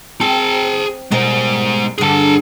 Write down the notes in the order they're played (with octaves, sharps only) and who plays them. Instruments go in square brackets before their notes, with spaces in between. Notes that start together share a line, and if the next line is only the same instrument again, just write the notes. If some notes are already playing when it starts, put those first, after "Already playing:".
[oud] C4 [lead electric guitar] G#4 A5
[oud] B2 G3 A#4 [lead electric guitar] G#3 C5
[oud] G2 D3 [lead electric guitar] G#4 A5